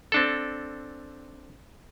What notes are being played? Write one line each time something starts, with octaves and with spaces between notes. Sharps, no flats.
C4 D4 A4